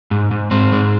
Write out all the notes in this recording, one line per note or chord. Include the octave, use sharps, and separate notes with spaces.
G#2
G#2
G#2 C4
G#3